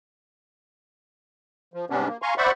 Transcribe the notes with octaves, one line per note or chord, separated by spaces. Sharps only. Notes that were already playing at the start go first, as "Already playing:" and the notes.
F3
G#2 C3 G3 B3 C#4 D4
A#3
F5 G#5 A#5 C6 C#6
C5 D5 E5 F#5 B5 C#6